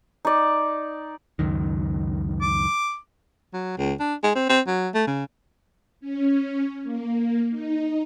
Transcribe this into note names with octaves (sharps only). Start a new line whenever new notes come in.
D#4 D5
C#2 F#2 D#3
D6
F#3
C#2
D4
G#3
C4
C4
F#3
A3
C#3
C#4
A#3
D#4